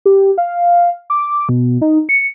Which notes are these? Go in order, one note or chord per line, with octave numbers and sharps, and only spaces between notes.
G4
F5
D6
B2
D#4
C#7